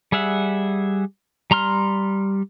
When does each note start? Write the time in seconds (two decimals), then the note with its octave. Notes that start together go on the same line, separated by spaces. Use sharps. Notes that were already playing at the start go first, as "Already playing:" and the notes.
0.12 G3 G#4 E5 F#5
1.51 G3 A#5 C6 F6